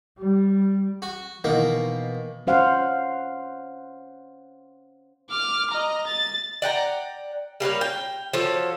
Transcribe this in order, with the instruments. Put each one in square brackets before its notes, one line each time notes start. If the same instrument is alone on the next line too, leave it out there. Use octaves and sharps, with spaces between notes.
[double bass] G3
[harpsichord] F#4
[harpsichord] B2 A#3 [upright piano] D#3 E3
[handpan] C#4 C5 F5 F#5
[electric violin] D6 F6
D#5 A#5
A6
[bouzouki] D5 F#5 G5 A#5
G3 A#3 B4 C#5
G5
F3 F#4 A4 C#5